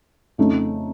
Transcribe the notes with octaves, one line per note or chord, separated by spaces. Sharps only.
F2 C#3 A3 D#4